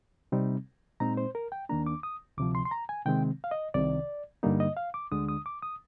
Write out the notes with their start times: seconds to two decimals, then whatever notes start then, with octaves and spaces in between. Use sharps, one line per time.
0.32 C3 G3 C4 D#4
1.00 A#2 G#3 C4 D#4 A#5
1.17 C5
1.35 A#4
1.52 G5
1.69 D#2 D#3 A#3 D4 A#5
1.86 D6
2.03 D#6
2.38 D2 C3 F3 D6
2.55 C6
2.65 C6
2.71 A#5
2.89 G#5
3.06 C3 D#3 G#3 C4 G5
3.44 F5
3.51 D#5
3.74 C2 C3 D#3 D5
4.43 G2 D3 G3 A#3 D#4
4.60 D#5
4.77 F5
4.94 D6
5.12 D2 D3 G#3 D4 D#6
5.28 D#6
5.46 D6
5.62 D#6